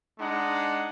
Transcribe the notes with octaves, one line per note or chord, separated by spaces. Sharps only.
G#3 D4 D#4 F#5